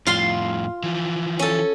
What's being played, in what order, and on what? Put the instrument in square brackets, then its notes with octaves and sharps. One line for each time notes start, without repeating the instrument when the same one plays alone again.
[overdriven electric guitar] F2 A2 [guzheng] F4 F5 C6
[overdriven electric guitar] E3 F3
[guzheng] C#4 A4